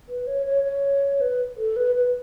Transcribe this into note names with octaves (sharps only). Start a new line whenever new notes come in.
B4
C#5
C#5
C#5
B4
A4
B4
B4